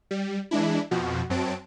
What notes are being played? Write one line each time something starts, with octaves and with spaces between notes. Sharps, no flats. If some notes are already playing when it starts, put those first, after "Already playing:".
G3
E3 G#3 D4 E4
F2 B2 F3 F#4
F#2 F#3 C4 A5 D7